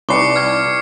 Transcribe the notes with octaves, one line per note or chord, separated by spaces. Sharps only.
C2 D#4 B4 D5 C#6 D6 C7 C#7
F6 G#6